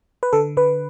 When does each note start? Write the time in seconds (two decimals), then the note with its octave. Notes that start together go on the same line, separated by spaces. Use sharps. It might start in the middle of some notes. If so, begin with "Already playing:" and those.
0.23 B4
0.33 D3 A4
0.57 D3 B4